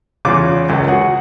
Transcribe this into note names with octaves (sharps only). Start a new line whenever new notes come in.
E2 C#3 C#4 F4 D6
C#2 F#2 C#4
F#4 G#4 F#5